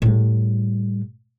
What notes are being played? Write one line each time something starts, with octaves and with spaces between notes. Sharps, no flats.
A2 G3